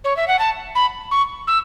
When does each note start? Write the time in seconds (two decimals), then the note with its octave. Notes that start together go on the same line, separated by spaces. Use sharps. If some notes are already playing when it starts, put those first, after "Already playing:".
0.04 C#5
0.17 E5
0.28 F#5
0.39 A5
0.75 B5
1.11 C#6
1.47 E6